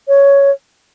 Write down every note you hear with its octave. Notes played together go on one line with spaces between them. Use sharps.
C#5